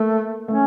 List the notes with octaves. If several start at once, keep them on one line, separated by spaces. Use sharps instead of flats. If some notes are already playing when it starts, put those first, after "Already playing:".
Already playing: A3 A#3
A3 C#4